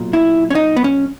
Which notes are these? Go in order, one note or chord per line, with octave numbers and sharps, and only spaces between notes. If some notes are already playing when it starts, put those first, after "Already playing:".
Already playing: B1 A#2
E4
C#4
D#4
B3
C#4